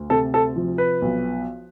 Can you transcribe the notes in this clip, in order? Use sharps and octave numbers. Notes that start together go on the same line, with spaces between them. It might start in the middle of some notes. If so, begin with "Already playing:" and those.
Already playing: D2
C3 A4
A4
F3
B4
B1